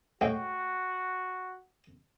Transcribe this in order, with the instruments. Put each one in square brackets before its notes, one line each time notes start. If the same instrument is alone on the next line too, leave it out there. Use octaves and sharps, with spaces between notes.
[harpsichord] A2 G#3 [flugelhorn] F#4 [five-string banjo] G5